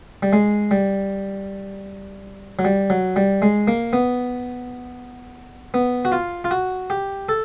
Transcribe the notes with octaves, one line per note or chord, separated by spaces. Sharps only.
G3
G#3
G3
F#3
G3
F#3
G3
G#3
A#3
B3
B3
F#4
F4
F4
F#4
G4
A4